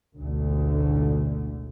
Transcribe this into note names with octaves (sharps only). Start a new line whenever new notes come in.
A1 D2 G#2 B2 D3 A3